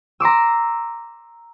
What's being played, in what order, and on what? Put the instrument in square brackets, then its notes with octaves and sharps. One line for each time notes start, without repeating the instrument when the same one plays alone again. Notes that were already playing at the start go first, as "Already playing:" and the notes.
[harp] A#5 C6 D6 E6